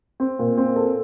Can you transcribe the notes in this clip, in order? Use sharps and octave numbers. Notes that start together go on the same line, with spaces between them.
C4
A#2
C4
A4